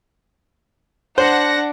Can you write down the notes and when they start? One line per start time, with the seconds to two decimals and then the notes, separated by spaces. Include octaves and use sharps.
1.18 D4 C5 F#5 A#6